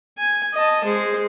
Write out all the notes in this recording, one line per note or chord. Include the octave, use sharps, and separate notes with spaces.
G#5
D#5 A5
G#3 C5